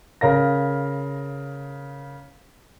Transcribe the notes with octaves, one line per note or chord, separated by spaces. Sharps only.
C#3 A#4 F5 A#6